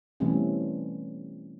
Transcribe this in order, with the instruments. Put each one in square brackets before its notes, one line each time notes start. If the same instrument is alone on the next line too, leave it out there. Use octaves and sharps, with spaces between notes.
[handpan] B2 E3 G3 A3 C4 C#4